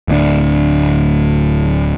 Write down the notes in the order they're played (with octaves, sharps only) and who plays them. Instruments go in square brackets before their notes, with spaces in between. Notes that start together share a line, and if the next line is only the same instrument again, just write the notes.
[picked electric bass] D1 D2 D3 D4